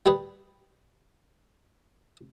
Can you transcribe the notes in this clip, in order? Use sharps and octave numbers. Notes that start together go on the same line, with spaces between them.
G3 G4 G#4 B4